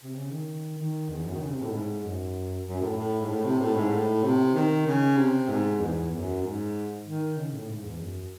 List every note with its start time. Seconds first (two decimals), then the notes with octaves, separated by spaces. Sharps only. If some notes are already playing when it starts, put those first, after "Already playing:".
0.03 C3
0.15 C#3
0.30 D#3
0.78 D#3
1.09 E2
1.24 F#2
1.34 D#3
1.40 C#3
1.51 C3
1.61 A2
1.71 G#2
2.03 F#2
2.66 F#2
2.81 A2
2.97 A2
3.21 G#2
3.29 A2
3.44 C3
3.60 A2
3.76 G#2
3.92 A2
4.23 C3
4.54 D#3
4.86 C#3
5.17 C3
5.48 G#2
5.80 E2
6.11 F#2
6.43 G#2
7.05 D#3
7.36 C#3
7.53 A2
7.68 G#2
7.84 E2
8.00 F#2